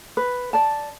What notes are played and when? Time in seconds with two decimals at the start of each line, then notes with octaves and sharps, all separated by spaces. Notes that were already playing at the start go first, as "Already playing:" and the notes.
0.17 B4
0.53 D5 A5